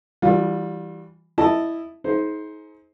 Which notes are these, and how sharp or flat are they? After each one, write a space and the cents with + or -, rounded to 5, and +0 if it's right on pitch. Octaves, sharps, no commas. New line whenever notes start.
E3 +0 G3 +0 F4 +40
E4 +0 D#5 -15 A5 +0
D#4 +35 G#4 +40 C5 +5